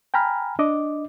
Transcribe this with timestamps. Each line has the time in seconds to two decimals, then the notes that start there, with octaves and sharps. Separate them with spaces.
0.14 G5 G#5 A#5 B5 F6
0.59 D4 D#5 D6